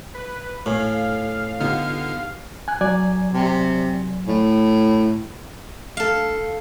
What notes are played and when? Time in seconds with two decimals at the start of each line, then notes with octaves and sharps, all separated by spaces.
0.14 B4
0.66 A2 A4 F5 G#5
1.60 D3 B3 D#4 F4 G4 F6
2.68 G#5 F#6
2.81 F#3 D5 G#5
3.34 C3
4.27 A2
5.97 A4 F5